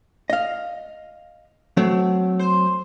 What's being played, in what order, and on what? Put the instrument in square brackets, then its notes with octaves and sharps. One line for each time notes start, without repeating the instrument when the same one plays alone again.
[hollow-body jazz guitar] D#5 F5
F#3 A3 C4
[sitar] C5